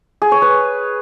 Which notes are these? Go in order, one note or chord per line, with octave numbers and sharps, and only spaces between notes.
G#4
C#5
B4